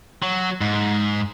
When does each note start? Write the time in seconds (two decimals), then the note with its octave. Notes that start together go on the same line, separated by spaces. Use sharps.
0.23 F#3
0.61 G#2